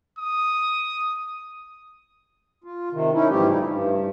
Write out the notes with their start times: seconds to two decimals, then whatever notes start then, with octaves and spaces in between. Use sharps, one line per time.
0.19 D#6
2.64 F4
2.92 C3 D#3
3.13 C#4 D#4 E4
3.30 G#2 E3 F3 G3 A3 G4
3.49 F#2 C#3 G3 D#4 E4
3.65 G2